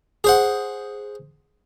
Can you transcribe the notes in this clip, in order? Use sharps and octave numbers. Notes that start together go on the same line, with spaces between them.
G#4 C5 F#5